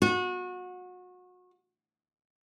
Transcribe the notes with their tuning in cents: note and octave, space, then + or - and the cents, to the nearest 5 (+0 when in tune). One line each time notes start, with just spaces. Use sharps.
F#4 -30